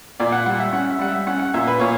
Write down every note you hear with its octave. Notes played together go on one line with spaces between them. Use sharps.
A#2 D5
F#5
G3 F#5
E5
C#4 F#5
E5
G3 F#5
E5
C#4 F#5
F#5
A#2 E5
B4
A#2 C#5